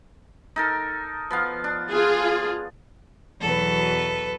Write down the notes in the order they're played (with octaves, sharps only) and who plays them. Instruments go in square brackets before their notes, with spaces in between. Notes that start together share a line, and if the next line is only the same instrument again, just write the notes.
[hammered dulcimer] D#4 A4 A#4
F3 B3 F5
D4
[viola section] F4 G#4
[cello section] E2 B2 F#3 [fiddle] A4 B4